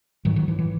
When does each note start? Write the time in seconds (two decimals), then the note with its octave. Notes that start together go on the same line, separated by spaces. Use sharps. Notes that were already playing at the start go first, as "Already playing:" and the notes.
0.25 G#2 D#3 F#3
0.36 D#3 F#3
0.48 E3
0.59 E3